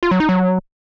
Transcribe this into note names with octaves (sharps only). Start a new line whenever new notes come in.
F4
F#3
D#4
F#3